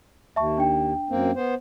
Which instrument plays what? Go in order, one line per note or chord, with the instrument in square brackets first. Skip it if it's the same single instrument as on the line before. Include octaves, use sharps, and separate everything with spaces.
[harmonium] D#2 [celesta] E5 A5 C#6
[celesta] D4 G5
[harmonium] F#2 A#3 C4
B3 C5